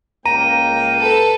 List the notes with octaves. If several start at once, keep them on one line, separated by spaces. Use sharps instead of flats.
C#2 A#3 G5 A#5 D#7
A4 B4